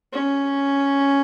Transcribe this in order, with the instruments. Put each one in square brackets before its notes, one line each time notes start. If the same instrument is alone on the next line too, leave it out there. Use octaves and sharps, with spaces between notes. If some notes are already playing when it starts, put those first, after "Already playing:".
[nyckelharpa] C#4